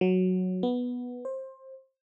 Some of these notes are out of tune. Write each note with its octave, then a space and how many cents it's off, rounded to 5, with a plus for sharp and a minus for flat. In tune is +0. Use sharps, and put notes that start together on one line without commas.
F#3 -5
B3 -5
C5 +20